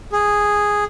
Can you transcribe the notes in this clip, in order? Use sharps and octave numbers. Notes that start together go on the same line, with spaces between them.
G#4